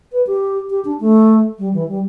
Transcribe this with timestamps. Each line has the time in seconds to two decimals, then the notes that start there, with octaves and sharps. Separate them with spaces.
0.12 B4
0.27 G4
0.70 G4
0.85 D4
1.00 A3
1.59 G3
1.74 E3
1.88 G3